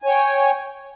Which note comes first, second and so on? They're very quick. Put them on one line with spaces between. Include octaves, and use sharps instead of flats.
G#5 C#5 G5